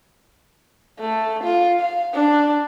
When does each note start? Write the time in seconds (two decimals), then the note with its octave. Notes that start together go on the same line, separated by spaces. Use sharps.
1.00 A3
1.44 F4
1.80 F5
2.14 D4